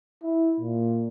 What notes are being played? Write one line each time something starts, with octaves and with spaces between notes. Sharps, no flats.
E4
A#2